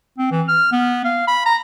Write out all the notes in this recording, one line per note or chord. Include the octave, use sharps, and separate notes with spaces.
C4
E3
F6
B3
F5
B5
A#5